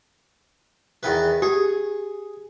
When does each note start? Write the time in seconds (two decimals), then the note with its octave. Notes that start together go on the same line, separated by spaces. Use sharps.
1.03 E2 D#3 B4
1.42 G4 G#4